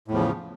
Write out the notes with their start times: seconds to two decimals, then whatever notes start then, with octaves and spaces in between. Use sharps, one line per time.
0.08 A2
0.11 E2
0.14 F3
0.17 C#3